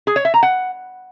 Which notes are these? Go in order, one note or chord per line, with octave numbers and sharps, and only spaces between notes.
G#4
C#5
E5
A#5
F#5